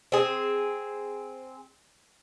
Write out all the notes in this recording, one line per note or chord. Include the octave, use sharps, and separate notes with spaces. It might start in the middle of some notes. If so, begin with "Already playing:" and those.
C4 G#4